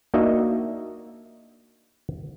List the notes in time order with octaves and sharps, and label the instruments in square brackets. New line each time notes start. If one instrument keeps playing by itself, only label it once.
[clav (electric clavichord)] A#3 D4 D#4 F#4 D#5 E5